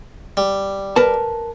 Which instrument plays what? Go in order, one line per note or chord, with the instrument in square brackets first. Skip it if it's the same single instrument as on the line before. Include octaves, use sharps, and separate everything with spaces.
[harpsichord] G3
[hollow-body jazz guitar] A#4 B4 A5